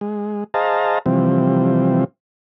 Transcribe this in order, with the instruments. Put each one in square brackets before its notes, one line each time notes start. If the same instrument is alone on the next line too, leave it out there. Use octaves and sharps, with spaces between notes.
[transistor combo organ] G#3
G#4 C5 D#5 F5 A5 A#5
C3 E3 F3 G3 C4